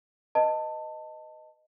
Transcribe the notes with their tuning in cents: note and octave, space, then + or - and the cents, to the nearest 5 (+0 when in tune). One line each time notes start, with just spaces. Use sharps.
B4 +0 D#5 +0 A5 +20